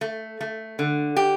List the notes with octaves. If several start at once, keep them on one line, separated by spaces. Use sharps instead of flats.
A3
A3
D3
G4